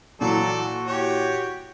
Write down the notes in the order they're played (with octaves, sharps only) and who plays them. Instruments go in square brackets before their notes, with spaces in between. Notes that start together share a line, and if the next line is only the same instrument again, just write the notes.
[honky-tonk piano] A#2 E3 [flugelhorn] F#3 [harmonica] A4 D5
[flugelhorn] F#4
[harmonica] G4 C#5